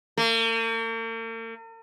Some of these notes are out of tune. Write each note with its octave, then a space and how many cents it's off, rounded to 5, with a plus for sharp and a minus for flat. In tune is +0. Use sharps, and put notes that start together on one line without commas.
A#3 -45